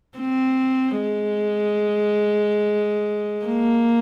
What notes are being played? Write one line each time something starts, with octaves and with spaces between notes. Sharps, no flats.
C4
G#3
A#3